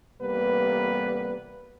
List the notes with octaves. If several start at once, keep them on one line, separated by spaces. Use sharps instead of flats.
A1 C3 G3 A#3 B3 B4